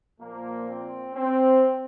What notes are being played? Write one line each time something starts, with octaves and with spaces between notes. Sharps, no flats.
A#2 F3 A#3
C4
C4